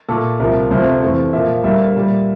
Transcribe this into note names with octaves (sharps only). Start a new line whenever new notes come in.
A#2 A3 A4
C2 C3 F3 A#4
D2 C3 F3 A3 C5
F2 E3 A3
A#2 F3 A#3 E5
F5
D2 D3 G3 A#3 E5
A#2 G3 A#3